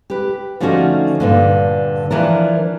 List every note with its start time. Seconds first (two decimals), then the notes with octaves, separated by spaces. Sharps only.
0.10 G4 B4
0.60 D3 F3 A3 C#4 D#4 F#4
1.20 G2 A#2 D3
2.11 E3 F3 D4 A#4